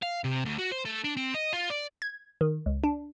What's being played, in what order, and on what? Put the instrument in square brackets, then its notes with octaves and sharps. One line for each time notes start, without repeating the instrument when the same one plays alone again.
[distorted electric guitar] F5
C3
D2
F#4
C5
A3
D4
C4
D#5
F4
D5
[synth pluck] G#6
D#3
C#2
D4